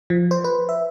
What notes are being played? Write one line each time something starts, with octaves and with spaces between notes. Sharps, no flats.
F3
C5
B4
E5